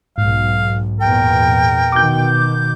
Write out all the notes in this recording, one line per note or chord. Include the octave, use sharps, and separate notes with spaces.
B1 G#2 F5
E2 A#2 A#4 G5
B2 D#3 D6 G6